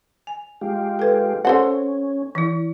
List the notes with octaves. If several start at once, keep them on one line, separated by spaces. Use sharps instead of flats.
G#5
G#3 F4 G4
A4 B4
C4 C#4 A4 C5 F#5
E3 E4